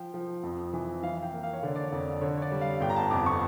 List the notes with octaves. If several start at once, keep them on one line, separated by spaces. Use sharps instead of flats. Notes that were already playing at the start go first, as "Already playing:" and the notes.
Already playing: F3 G5
F3
F2
E3
E3 F5
G5
A#3
F5
C#5
D3 D5
D5
C#5
F2
D3 C#5
C#5
D5
G3
F5
G1 G5
A#5
A5
F2 D6
C#6